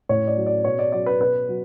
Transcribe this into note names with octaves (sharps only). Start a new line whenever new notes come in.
A2 C#5
D5
F#3
D5
B2 C#5
D5
F#3 D5
B4
B2 B4
F#3